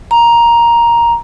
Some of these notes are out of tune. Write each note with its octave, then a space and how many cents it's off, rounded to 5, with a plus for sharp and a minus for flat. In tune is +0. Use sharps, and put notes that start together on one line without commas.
A#5 +10